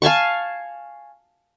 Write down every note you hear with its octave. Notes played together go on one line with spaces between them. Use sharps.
F5 G#5 A5 C#6